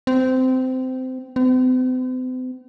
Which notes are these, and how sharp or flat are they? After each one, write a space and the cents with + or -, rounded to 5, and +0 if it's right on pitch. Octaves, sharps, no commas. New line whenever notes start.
C4 -20
C4 -45